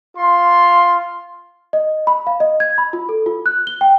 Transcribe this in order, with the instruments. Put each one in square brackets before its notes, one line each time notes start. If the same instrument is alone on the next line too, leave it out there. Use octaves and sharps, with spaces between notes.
[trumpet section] F4 C6
[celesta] D#5
B5
F5
D#5
G#6
B5
F4
A4
F4
F#6
G7
G5